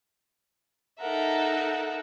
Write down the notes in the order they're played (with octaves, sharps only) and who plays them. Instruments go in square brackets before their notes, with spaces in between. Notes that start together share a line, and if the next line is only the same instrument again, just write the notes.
[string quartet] D#4 A4 E5 [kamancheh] A#4 F#5